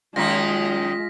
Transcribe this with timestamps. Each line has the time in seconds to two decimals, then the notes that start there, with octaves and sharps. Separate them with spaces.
0.16 F#2 D#3 G#3 A#3 F4 A#6 B6